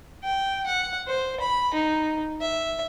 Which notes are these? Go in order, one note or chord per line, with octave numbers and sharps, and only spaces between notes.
G5
F#5
C5
B5
D#4
E5